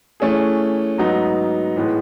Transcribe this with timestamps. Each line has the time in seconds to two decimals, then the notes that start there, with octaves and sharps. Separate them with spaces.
0.20 E3 A3 C#4 G#4
0.98 G#2 F#3 B3 D#4
1.76 A2 E3 G#3 B3